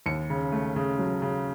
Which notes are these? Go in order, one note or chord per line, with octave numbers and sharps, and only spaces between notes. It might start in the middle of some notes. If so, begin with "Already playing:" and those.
D#2 C#7
C#3
A3
C#3
F#3
C#3